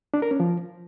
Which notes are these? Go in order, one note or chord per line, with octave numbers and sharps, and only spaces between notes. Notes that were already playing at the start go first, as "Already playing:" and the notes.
D4
A#4
C#4
F3